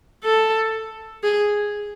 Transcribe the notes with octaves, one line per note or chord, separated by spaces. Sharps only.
A4
G#4